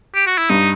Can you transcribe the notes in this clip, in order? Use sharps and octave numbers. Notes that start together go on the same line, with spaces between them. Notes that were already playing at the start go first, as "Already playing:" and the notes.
G4
F#4
E4
G2 D#4